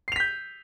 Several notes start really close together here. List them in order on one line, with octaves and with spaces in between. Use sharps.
C7 F7 B6 G6